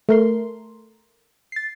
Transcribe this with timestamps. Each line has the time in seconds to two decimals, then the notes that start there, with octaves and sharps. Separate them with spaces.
0.09 A3 A#4 C6
1.52 A6 C7